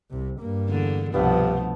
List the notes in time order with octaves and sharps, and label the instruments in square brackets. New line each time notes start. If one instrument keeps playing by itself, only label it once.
[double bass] C2 C3
G2 A#3
[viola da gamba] E2 D3 D4
[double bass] C2 [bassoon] G2 [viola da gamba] B2 F3 [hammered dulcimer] D3 A3 B3